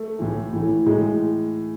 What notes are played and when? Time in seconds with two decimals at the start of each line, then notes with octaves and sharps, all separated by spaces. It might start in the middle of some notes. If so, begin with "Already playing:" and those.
Already playing: A3
0.19 A2 E3
0.53 A2 E3
0.86 A2 E3 G#3